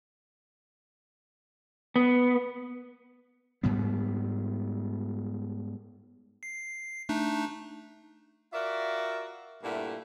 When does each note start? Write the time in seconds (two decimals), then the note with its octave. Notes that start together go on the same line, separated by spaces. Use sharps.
1.96 B3
3.63 G#2 G3 B3
6.43 C7
7.09 A3 D4 D#4
8.53 F4 F#4 A#4 D5 E5
9.63 G2 A#2 A3 A#3 E4 F#5